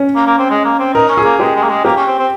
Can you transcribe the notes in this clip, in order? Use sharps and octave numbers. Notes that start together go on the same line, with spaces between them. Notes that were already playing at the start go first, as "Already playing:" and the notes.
Already playing: C#4
A#3
A#3
C4
G#3
A#3
C4
D#4 A#4
C#4
G#4
A#3
G#3 G4
G#3
A#3
G#3
A#3 G4
C#4
C4
C4